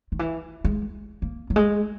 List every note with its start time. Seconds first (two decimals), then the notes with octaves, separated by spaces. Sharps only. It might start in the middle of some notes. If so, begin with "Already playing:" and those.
0.12 D#3
0.19 E3
0.64 G#3
1.22 A#3
1.50 F#3
1.56 G#3